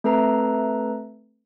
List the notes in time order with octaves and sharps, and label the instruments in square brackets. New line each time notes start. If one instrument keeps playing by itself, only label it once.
[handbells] A3 C4 A4 B4 A#5